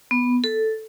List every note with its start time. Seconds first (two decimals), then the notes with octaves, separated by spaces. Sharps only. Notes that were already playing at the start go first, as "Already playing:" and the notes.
0.11 B3
0.44 A4